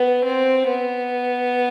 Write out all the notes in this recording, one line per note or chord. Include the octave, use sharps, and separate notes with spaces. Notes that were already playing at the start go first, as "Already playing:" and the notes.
Already playing: B3
C4
B3